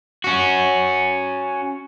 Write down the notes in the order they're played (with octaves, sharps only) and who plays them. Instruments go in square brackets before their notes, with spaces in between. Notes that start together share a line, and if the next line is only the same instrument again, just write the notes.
[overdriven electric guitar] C#4 F#4